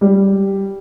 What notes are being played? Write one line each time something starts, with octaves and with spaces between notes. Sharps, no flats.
G3